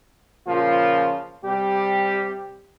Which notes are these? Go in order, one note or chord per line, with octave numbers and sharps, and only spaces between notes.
A#2 C#3 F3 F4
C3 G3 G4